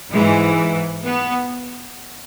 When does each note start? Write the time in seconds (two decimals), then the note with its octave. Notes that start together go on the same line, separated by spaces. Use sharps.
0.11 G#2 E3 G#3
1.05 B3